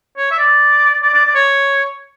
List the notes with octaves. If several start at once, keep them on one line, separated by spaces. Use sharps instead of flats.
C#5
E5
D5
D5
D5
D5
C#5